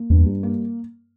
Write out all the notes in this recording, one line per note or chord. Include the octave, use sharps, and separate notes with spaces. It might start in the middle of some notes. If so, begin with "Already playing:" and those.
Already playing: A#3
E2 G2
G3
A#3